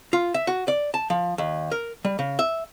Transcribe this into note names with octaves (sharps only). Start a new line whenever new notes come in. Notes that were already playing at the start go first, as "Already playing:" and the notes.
F4
E5
F#4
D5
A5
F3
D#2
A#4
G3
C#3
E5